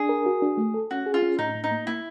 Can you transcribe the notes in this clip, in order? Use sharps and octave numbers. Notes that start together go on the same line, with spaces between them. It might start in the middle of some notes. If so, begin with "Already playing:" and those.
Already playing: D4 G#4
A#4
F#4
D4
A3
A4
C#4 F#4
G#4
F4
C#4
A2 D#4
A2
D#4
A#3
A#3 E4